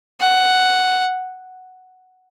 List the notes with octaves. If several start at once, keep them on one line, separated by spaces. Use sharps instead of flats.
F#5